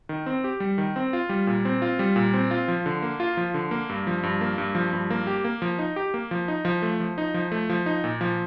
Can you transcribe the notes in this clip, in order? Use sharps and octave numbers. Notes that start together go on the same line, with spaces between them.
D#3
C4
G4
G3
D#3
C4
F4
G3
A#2
C4
F4
G3
A#2
C4
F4
F3
D3
A#3
F4
F3
D3
A#3
G2
F3
G2
A#3
G2
F3
G2
A#3
G4
A#3
F3
D#4
G4
A#3
F3
D#4
F3
A3
F3
D#4
F3
A3
F3
D#4
A#2
F3